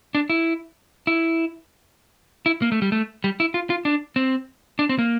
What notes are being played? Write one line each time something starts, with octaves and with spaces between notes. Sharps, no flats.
D4
E4
E4
E4
A#3
A3
G3
A3
G3
E4
F4
F4
D4
C4
D4
C4
A#3